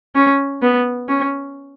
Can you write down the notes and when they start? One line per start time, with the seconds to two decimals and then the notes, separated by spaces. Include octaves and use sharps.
0.15 C#4
0.62 B3
1.09 C#4